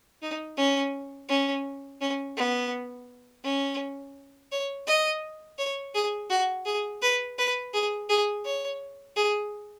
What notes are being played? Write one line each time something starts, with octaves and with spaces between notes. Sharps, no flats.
D#4
C#4
C#4
C#4
B3
C#4
C#5
D#5
C#5
G#4
F#4
G#4
B4
B4
G#4
G#4
C#5
G#4